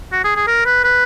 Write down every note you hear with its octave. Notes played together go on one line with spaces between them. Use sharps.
F#4
G#4
G#4
A#4
B4
B4